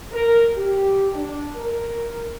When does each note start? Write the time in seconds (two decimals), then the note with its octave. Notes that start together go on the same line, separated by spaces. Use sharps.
0.11 A#4
0.56 G4
1.14 D4
1.56 A#4